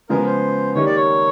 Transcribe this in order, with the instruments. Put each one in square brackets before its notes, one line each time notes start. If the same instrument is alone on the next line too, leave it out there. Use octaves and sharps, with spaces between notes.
[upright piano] C#3 F3 G#3 B3 [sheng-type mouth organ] A#4
[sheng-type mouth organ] C5
[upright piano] D#3 G3 A#3 D#4 G4 [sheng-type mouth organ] C#5
[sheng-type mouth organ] D5
C#5